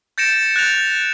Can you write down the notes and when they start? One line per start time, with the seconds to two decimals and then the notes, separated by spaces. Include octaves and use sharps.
0.18 G6 A6 A#6 C#7 D7 E7
0.56 F#6 A6 A#6 F7